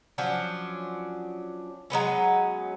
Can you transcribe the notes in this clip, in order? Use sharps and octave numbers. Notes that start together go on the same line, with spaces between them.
F3 F#3 C#4 D4
F#3 G#3 B3 C#4